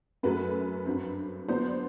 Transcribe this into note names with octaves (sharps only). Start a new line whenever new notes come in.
F#2 F#3 A3 B4
G2 F#3 C4
D3 F#3 B3 D4 C5